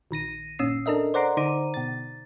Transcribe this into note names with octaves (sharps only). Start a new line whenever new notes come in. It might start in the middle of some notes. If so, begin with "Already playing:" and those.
A#1 D#3 A#6 D#7
G1 A#2 C#4 D#6 E6 C7
D4 A4 A#4 D#5 E5
C5 D5 F#5 A#5 C6 D6
D3 D#4 C5 A#5 D6 D#7
B2 A6